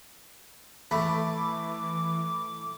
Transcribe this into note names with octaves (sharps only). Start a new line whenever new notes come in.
E3 A3 B5 D6